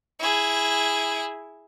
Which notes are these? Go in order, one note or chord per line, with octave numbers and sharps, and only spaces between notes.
E4 G#4